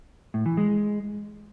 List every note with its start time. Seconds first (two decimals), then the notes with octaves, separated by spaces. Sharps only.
0.34 A2
0.46 E3
0.57 G#3